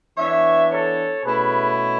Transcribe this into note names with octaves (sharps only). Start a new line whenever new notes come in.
E3 B3 D4 C#5 E5
A4 C#5
B2 A3 C#4 E4 G#4 B4